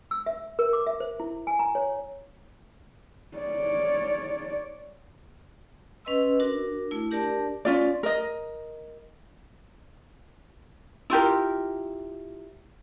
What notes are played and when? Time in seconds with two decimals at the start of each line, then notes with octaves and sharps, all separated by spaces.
0.11 E6
0.26 E5
0.59 A#4
0.73 D6
0.87 E5
1.00 C5
1.20 E4
1.47 G#5
1.59 A#5
1.75 C#5
3.37 C#5 D5
6.05 C#4 B4 D#5 C6 E6
6.39 D4 F#4 A#4
6.91 A3 E4
7.11 D4 G4 A#4 D5 A5
7.65 C#4 F4 D5
8.03 A#4 D#5
11.10 E4 F4 G4 A#4